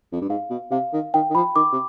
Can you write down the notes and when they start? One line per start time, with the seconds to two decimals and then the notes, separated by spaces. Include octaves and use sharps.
0.12 F2
0.22 G2
0.29 G#2 F5
0.50 B2
0.71 C3 F5
0.93 D#3
1.14 D#3 G5
1.30 D#3
1.35 F3 B5
1.56 D#3 D6
1.72 C3